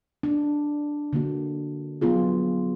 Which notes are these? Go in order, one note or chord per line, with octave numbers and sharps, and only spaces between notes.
D4
D3 A#3 F#4
F#3 B3 C4 F4 G#4